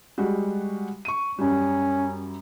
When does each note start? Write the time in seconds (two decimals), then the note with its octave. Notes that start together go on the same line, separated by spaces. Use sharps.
0.18 G3 G#3 F#4
1.05 C#6 D#7
1.38 F#2 G3 C#4